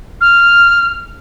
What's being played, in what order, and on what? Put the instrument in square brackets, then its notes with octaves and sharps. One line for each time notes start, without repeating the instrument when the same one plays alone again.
[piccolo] F6